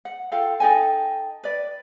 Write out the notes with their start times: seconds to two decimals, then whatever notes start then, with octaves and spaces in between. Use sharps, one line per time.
0.05 F#5
0.32 F4 A4 F5 G5
0.60 D#4 A4 G5 G#5
1.44 B4 D5